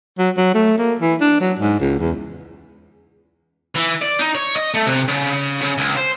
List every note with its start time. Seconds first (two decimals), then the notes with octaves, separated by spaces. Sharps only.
0.19 F#3
0.37 F#3
0.54 A3
0.78 A#3
1.01 E3
1.21 D4
1.41 F#3
1.59 G#2
1.80 C#2
1.99 E2
3.76 E3
4.02 D5
4.19 D#4
4.35 C#5
4.56 D#5
4.74 A3
4.86 C3
5.08 C#3
5.61 C#3
5.78 C#2
5.96 C5